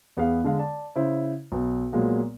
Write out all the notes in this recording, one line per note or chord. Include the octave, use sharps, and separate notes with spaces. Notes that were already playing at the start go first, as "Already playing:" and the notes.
E2 B3 G#4 F5
D3 G#3 F5
D5 A5
C#3 E4 C5
B1 B3
A#2 F#3 G#3 A#3 B3